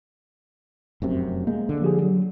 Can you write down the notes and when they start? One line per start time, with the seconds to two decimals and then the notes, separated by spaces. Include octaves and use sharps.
1.02 F1 F#2 C3
1.47 G#3 A#3
1.69 D3
1.82 F3 G4 G#4
2.03 F#3